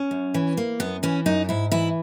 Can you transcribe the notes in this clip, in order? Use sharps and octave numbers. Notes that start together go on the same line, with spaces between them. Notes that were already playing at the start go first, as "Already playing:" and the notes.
Already playing: C#4
F#2
E3
A#3
F#2 B3
E3 C#4
F#2 D#4
G#2 E4
E3 E4